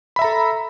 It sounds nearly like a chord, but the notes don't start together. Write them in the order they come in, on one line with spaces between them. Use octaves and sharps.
B5 E5 A#5 A4